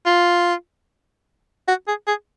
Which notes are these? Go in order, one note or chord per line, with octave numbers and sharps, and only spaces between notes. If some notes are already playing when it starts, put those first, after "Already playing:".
F4
F#4
G#4
G#4